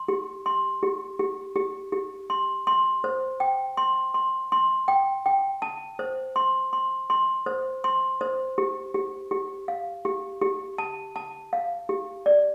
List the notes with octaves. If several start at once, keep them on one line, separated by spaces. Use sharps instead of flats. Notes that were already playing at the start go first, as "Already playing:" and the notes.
Already playing: C6
G4
C6
G4
G4
G4
G4
C6
C6
C5
G5
C6
C6
C6
G5
G5
A5
C5
C6
C6
C6
C5
C6
C5
G4
G4
G4
F5
G4
G4
A5
A5
F5
G4
D5